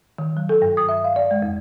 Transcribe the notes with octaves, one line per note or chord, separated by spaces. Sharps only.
D#3
F#3
A4
G2
D#6
E5
F5
D5
G#3
F2